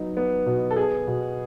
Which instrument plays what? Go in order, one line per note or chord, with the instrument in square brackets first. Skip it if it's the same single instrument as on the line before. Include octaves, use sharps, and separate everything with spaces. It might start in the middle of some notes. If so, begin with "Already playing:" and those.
Already playing: [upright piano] F#3 B3 D#4
B3
B2
A4
B3 G#4
B2